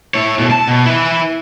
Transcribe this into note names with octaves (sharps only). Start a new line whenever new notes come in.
E4 C#5
B2 A3
A5
B2
E4 B4